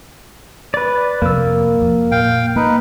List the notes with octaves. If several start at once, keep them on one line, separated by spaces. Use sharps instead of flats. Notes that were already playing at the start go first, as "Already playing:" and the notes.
B4 D5
F2 C3 A#3 E6
F2
A#2 F5 G5
A#3 D#4 B4